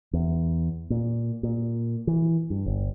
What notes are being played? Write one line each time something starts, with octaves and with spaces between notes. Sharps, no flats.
E2
A#2
A#2
E3
G2
G1